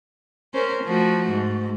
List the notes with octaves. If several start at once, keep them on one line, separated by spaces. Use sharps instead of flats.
C#4 A#4 C5
F3 A3 F#4
G#2